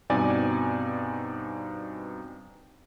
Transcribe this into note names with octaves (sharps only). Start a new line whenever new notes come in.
G2 B2 C4 D#4 D5 G#5